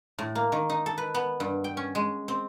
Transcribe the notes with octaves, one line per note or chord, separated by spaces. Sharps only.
A2
A#3
D#3
D#4
A4
B4
B3
G2
G5
C#4
G#3
C4